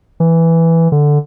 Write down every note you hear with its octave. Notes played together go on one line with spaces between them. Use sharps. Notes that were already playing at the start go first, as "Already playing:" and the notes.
E3
D3